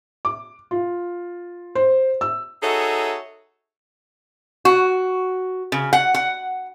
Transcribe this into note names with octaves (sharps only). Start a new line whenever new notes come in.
D6
F4
C5
E6
D#4 F#4 G#4 A4 C#5 E5
F#4
C#3
F#5
F#5